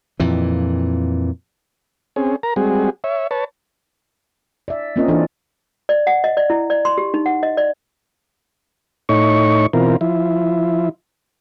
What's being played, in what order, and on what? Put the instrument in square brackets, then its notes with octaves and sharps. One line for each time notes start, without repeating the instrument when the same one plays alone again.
[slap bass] F2 A#2 E3
[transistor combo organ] C4 C#4 G#4
A#4 A#5
G3 G#3 C4 F#4 G#4
C#5 E5
B4 C#5 A5
[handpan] D5 E5
A#3 C4 C#4 F4 A#4 D#5
E3 D4 A4 D5 D#5
[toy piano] D5
F#5
D#5
D5
E4
D5
C6
G4
D#4
F#5
D#5
D5
[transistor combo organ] A2 D#4 C#5 C#6
B2 E3 C4 F4 A#4
F3 E4